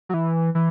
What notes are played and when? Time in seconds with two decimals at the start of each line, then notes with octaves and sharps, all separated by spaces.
0.09 F#3
0.14 E3
0.55 E3